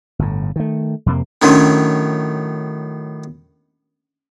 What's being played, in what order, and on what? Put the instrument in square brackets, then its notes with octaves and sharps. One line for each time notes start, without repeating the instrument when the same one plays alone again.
[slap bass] G1 A2
D#3 A3
F2 C3 A#3
[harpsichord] A2 D#3 F#3 [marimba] C#4 D4